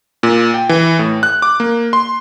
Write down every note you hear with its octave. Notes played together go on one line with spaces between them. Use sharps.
A#2
G5
E3
A2
F#6
D6
A#3
C6